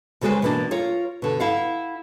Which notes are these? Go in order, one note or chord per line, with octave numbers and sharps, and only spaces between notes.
D2 C#3 G#3 A4 B4 C5
B2 E3 A#3 C#4 D4
F4 A#4 C#5
B2 D3
E4 F5 F#5